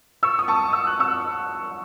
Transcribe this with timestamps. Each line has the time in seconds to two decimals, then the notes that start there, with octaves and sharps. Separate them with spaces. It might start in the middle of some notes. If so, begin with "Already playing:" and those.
0.23 C#6 E6
0.39 D#6
0.48 A5 C#6
0.73 E6
0.87 F#6
0.99 C#6 E6